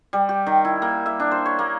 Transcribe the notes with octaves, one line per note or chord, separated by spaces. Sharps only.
G3
G4
D#3
E4
A#3
E5
D4
C5
C#5
A#3